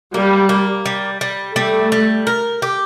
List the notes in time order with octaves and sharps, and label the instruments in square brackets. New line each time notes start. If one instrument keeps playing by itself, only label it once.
[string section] G3 [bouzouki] A#3
[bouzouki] A#3
G3
G3
[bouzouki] G3 [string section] A3
[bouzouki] G3
A#4
G4